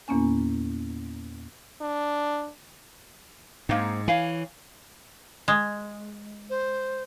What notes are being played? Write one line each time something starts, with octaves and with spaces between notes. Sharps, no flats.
E2 A#2 A#3 B3 C#4 G#5
D4
G#2 A#3 C4 D#4
E3 C#5 F5 G#5
G#3
C5